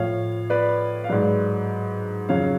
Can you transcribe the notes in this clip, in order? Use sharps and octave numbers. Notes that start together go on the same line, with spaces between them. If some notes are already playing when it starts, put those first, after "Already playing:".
Already playing: A2 F3 C#5 F5
B4 D5
F5
G#2 F#3 B4 D5
F2 C#3 F#3 C#5 F5